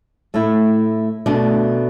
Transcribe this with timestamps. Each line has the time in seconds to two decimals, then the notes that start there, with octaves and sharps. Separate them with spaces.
0.34 A2 A3 E4
1.26 B2 A3 D4